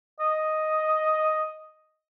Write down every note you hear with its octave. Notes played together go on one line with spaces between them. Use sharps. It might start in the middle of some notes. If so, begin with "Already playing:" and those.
D#5